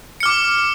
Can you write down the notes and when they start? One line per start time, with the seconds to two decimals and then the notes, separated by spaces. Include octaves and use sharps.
0.20 C#7
0.23 F6
0.26 D6